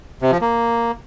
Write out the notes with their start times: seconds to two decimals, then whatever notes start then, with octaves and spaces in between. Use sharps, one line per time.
0.22 C3
0.31 F3
0.41 A#3